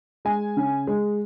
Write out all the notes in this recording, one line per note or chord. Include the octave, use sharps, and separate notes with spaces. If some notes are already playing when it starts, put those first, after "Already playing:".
G#3 G#5
C#3
G#3